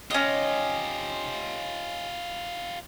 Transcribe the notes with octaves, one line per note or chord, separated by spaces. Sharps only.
C#4 F4 G4 D#5